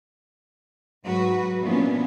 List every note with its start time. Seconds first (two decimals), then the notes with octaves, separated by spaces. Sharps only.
1.04 G#2 F#3 F#4 B4
1.61 A#2 E3 F3 B3 C#4 D4